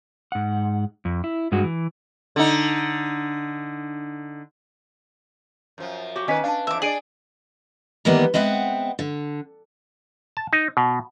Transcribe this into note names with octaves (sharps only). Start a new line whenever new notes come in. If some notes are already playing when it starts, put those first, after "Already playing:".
G#2 F#5
F2
E4
G2 G#3 F#4
E3
D3 D#4
F#2 F3
F#4 G4
D#3 C#4 B4 D#5 B6
D4 F5 A5
F2 E3 E5 D6
D4 G#4 D5 D7 D#7 F#7
D#3 E3 G3 A#3 B3
G#3 B3 C4 E5 F#5
D3
A5
D#4
B2